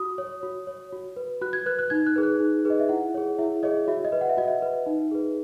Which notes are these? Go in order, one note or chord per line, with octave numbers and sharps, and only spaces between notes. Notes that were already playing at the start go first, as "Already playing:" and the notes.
Already playing: F#4 D#6
C#5
F#4
C#5
F#4
B4
F#4 F#6
G#6
B4 F#6
F#6
D#4 G#6
F#6
G#4 B4
F#6
D#4
G#4 B4 D#5
E5
E4 F#5
G#4 C#5
E4 E5
G#4 C#5 D#5
F#4 E5
D#5
B4
F#5
E5
F#4 D#5
E5
B4
D#4
G#4 B4